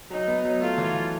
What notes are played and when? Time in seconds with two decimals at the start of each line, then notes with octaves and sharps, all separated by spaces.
0.10 F#3 D#4
0.27 B3
0.45 F#3
0.61 A3 F4
0.78 E3